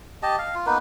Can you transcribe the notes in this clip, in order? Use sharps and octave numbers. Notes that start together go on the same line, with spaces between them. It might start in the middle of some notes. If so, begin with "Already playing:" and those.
G4 D#5 A5
F5
F4
A#3 B3 D#4 B4